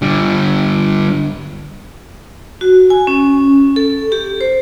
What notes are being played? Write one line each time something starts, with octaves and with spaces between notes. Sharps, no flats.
D3 G3
F#4
G#5
C#4
A4
G4
C5